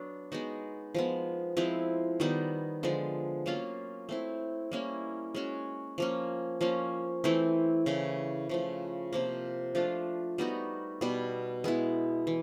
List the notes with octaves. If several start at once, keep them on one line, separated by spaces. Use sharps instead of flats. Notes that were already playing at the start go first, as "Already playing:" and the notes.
Already playing: F#3 B3 D4
G#3 B3 D#4 F#4
F3 G#3 B3
F3 G#3 C4 E4
D#3 G3 B3 D#4
D3 F3 G#3
F#3 A#3 C#4 F4
A3 C4 E4
G3 A#3 C#4 E4
G#3 C#4 F#4
F3 A#3 C#4
F3 A#3 C#4
E3 A3 C4 E4
C#3 E3 A3
C#3 F3 A3
C3 F3 A#3
F3 A3 D4 F4
G3 B3 D#4 F#4
B2 G3 B3
G#3 B3 E4
E3